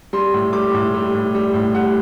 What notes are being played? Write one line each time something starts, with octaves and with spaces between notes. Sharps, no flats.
G3 C6
A2
G3 D6
A2
G3
A2
G3
A2
G3 F#5